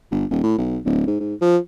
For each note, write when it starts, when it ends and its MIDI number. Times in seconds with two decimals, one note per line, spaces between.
0.11 0.25 31
0.30 0.40 27
0.43 0.57 45
0.58 0.78 35
0.85 1.04 26
1.07 1.17 44
1.20 1.34 44
1.41 1.57 53